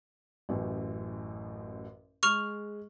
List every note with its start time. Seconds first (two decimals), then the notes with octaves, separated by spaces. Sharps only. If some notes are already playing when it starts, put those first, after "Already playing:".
0.49 A1 F#2 A2
2.23 G#3 G#4 C#6 F6 F7